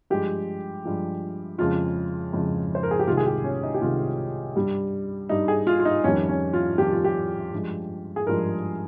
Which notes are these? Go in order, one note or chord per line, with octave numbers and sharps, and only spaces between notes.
G2 F3 G#3 G4
G2 F3 G#3
F2 C#3 G#3 F4
F2 C#3 G#3
C5
A#4
G#4
G4
C2 C3 D#3 G#3 F4
G#4
G4
C#4
D#4
G4
C2 C3 D#3 G#3 F4
G2 G3
G2 G3 D#4
G#4
F4
F4
D#4
F2 D#3 G3 C#4
C#4
F4
F2 D#3 G3 G4
F4
G4
G2 F3 G#3
G#4
G2 F3 G#3 A#4